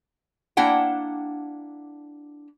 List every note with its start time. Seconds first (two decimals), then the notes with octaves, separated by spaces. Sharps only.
0.57 A#3 D4 E4 F#5 G5